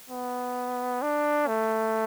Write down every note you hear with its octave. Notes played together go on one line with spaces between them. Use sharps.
B3
D4
A3